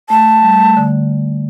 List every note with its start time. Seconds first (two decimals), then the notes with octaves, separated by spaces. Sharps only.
0.10 A3 A5
0.43 G3
0.60 A3
0.77 D3